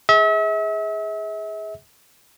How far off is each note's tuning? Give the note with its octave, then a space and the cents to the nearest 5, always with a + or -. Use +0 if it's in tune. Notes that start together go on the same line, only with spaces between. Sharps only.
G#4 +0 E5 -40